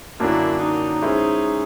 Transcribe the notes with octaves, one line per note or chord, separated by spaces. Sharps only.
F#2 D3 F#3 A#3 D4 E4
D#4
G#3 C#4 E4 G#4 C5